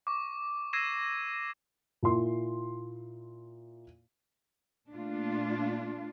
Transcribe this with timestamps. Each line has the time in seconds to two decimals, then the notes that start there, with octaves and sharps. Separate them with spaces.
0.07 C#6 D6
0.73 E6 G#6 A#6 C7 D#7 E7
2.03 A#2 E4 C6
4.92 A#2 A3 D4 F4